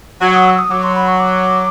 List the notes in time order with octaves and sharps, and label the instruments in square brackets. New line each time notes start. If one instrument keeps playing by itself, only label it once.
[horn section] F#3
[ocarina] D#6
E6
D#6
[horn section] F#3 [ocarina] D6
[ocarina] C6
B5
C#6
D6